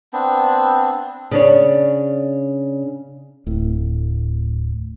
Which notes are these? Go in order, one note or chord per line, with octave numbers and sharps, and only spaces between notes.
B3 C4 D4
C#3 D4 C#5
D1 A2